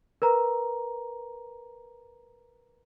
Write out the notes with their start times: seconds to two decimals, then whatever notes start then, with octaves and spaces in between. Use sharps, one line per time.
0.22 A#4 B4 A#5